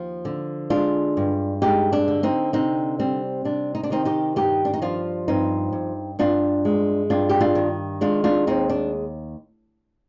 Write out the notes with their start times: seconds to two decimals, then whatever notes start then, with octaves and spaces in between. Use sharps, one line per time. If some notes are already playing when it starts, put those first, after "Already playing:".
Already playing: D#2 F3
0.25 D3
0.70 G#3 D4 F4
1.17 G2
1.62 G#3 D#4 G4
1.93 D4
2.08 D3
2.23 C4 D#4
2.53 C3 C4 D#4
2.99 G3 C4
3.45 C3 D4
3.75 D#4
3.83 D4
3.90 D#3 C4 D#4
4.05 D#4 G4
4.36 G2 D#4 G4
4.65 D4
4.74 D#4
4.82 F3 D4 F4
5.28 G2 C4 D#4
5.73 G2
6.19 G2 D4 F4
6.65 G#3
7.10 G2 D4 F4
7.29 G4
7.40 D4 F4
7.55 D#3
8.01 G#3 D4 F4
8.24 D4 F4
8.47 D#2 C4 D#4
8.70 D4